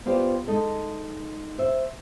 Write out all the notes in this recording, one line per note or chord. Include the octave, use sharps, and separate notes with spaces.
B3 F4 G4 C5 D5
G#3 D#4 A4
C5 E5